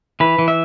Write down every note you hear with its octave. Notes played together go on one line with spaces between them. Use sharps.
E3 B4
E3
E5